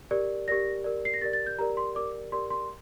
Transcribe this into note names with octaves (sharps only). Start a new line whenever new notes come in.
G4 A#4 D5
G4 A#4 D5 A#6
G4 A#4 D5
C7
A#6
G4 A#4 D5 A6
A6
G6
G4 A#4 D5 A#5
C6
G4 A#4 D5 D6
G4 A#4 D5 C6
C6